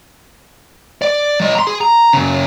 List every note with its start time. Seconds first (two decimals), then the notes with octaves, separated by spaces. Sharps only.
1.02 D5
1.40 F#3 D#5
1.55 A#5 C6
1.67 G#4
1.81 A#5
2.13 F#2 C#3